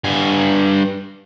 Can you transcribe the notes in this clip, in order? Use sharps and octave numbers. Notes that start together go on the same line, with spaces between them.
G2 G#5